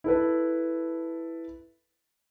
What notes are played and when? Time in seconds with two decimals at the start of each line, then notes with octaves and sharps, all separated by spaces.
0.04 E4 A4 B4